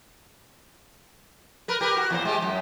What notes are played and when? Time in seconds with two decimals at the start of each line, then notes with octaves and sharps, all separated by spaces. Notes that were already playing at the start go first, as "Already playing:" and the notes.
1.68 A#4 B4
1.81 G4 A#4 B4
1.97 F#4
2.11 E2 A#2 C5
2.25 G#3 G4
2.42 F#2